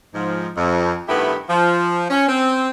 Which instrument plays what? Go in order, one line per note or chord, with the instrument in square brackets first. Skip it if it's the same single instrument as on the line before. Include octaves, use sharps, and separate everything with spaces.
[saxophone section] G#2 F3
F2
G2 D#3 A3 B3 E4 G4
F3
C#4
C4